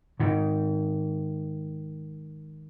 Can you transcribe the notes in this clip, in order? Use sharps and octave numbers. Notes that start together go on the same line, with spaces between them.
G#2 D#3